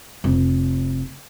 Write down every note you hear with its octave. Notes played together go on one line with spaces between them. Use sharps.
F1